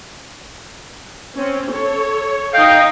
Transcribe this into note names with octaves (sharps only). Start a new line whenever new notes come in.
C4 C#4
A4 C#5
D#4 D#5 F5 G5